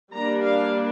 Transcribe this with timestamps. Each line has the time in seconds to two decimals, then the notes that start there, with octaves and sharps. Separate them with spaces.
0.13 G3 A#3 D4 A#5
0.42 F5